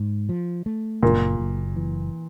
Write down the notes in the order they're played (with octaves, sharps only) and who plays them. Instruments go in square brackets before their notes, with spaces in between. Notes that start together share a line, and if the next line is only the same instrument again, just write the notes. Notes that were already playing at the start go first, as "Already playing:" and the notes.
Already playing: [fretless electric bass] G#2
F3
A3
[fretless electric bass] F#1 [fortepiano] A#2
[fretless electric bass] F#1
E3